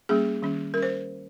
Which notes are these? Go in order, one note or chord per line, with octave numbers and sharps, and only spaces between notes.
G3 A#3 C#4 G#4
D#3 G3 C#4
G3 C#4 A#4
C5